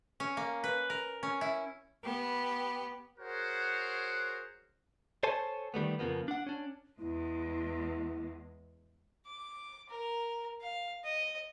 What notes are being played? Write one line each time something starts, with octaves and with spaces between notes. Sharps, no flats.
C#4
A#3
B4
A#4
C#4
E4
B3 G4
F#4 G#4 A#4 C5 C#5 F#5
A4 C5 C#5 G#5 A5
D#3 G3 A3 B3
F2 C#3 F3 A#3 B3
D4 F#5
C#4 D4
E2 G#3 E4
D6
A#4
F5
D#5